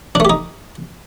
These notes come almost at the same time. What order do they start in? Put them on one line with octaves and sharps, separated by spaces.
D4 A3 G4 D#4